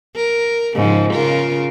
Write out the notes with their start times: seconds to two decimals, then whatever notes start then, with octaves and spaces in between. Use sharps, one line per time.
0.16 A#4
0.75 G#2 C#3 F3
1.13 C#3 F4 A#4